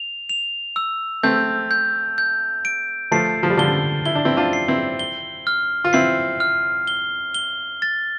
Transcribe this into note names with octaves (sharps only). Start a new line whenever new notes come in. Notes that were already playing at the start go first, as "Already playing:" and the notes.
Already playing: F7
F7
E6
A3 C4 G6
G6
G6
D7
F3 A3 C7
F3
G3
D3 F3 G7
E4 G7
D4
C4 E4
D4 F4
C7
C4 E4
G7
F6
F4
C4 E4 C7
F6
G7
G7
A6